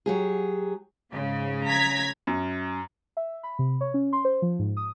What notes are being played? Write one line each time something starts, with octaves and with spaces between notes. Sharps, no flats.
F#3 G4 G#4
G#2 C#3
A#5 G#6 B6
F#2
E5
B5
C3
C#5
C#4
C6
C5
F3
G#2
D#6